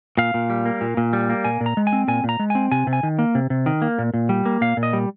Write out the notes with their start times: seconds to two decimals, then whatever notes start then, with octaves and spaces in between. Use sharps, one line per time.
0.17 A#2 F5
0.34 A#2
0.50 G3
0.65 A#3
0.81 A#2
0.97 A#2
1.13 G3
1.30 A#3
1.45 A#2 G#5
1.61 A#2
1.66 A#5
1.77 G#3
1.87 G#5
1.93 C4
2.08 A#2 G#5
2.24 A#2 A#5
2.39 G#3
2.50 C4 G#5
2.72 C3 G#5
2.87 C3
2.93 G#5
3.03 D#3
3.19 A#3
3.35 C3
3.50 C3
3.66 D#3
3.82 A#3
3.99 A#2
4.14 A#2
4.29 G3
4.45 A#3
4.61 A#2 F5
4.77 A#2
4.83 D#5
4.93 G3